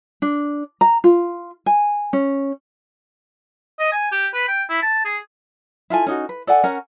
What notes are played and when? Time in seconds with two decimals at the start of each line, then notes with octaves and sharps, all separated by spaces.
0.22 D4
0.81 A#5
1.04 F4
1.66 G#5
2.13 C#4
3.79 D#5
3.92 G#5
4.12 G4
4.34 B4
4.48 G5
4.70 E4
4.83 A5
5.05 G#4
5.90 E4 F4 A4 G#5
6.06 C#4 D#4 F#4
6.29 B4
6.47 A4 D5 F#5 G#5
6.64 C#4 A#4 F#5